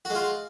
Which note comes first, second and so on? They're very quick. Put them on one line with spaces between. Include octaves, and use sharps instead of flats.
F#4 G#3 F4